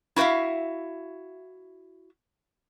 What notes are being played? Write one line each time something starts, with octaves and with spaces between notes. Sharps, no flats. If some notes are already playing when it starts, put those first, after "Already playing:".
E4 F#4 B4 E5 F5